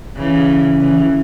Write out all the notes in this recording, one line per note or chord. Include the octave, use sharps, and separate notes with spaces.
C#3 E3
C#3 E3